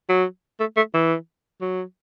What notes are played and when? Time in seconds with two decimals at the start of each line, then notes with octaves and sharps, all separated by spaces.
0.09 F#3
0.60 A3
0.77 A3
0.94 E3
1.61 F#3